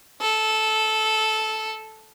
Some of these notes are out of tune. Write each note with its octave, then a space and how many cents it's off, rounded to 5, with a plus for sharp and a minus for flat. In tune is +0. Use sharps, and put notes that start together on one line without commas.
A4 -10